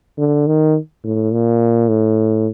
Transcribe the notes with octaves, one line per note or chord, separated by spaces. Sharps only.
D3
D#3
A2
A#2
A2